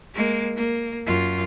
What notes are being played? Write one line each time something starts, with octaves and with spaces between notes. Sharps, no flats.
G#3 A#3
A#3
F#2 F4